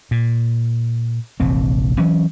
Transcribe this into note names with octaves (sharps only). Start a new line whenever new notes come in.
A#2
F1 A#1 E3 C4
E3 F#3 C#4